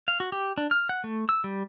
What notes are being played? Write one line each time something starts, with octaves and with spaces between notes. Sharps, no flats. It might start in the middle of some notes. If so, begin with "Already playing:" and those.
F5
F#4
G4
D4
F6
F#5
A3
E6
G3